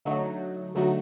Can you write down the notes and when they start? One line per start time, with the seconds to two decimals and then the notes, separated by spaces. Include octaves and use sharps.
0.05 D3 F#3 A3 D#4 F#4
0.75 D3 F#3 A3 D#4 F#4